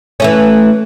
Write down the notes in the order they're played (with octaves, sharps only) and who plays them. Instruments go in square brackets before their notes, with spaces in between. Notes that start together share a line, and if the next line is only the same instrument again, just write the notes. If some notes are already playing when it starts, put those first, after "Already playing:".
[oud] E3 A3 C#4